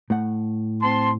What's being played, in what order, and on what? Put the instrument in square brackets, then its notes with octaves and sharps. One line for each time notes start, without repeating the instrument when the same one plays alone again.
[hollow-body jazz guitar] A2 A3 F#5
[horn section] C4 A5 C6